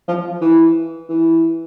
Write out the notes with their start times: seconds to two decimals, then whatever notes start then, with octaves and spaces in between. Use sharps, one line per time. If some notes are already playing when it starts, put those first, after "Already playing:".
0.08 F3
0.41 E3
1.09 E3